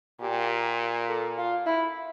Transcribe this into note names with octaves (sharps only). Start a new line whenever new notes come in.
A#2 G4
A4
F4
E4